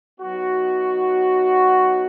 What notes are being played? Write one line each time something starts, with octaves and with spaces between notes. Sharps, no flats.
F#3 B3 D#4 F#4